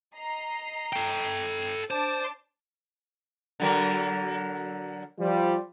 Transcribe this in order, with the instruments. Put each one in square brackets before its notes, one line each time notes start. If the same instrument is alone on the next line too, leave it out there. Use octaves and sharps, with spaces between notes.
[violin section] D#5 A#5 C7
[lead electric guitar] A4 G5
[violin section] D4 A5 D6 [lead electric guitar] C5
[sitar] D3 F#3 A#4
[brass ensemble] F3 G3 F4